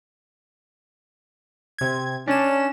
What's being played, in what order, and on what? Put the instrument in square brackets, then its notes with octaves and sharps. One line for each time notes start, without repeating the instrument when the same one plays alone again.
[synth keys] C3 G#6
[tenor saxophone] C#4 [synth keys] D4 E7